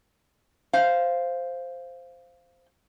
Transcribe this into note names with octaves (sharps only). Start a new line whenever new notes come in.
C5 F5